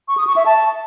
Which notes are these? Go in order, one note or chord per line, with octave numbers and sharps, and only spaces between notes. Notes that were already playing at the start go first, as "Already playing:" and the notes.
C#6
D#6
C#6
E5
A5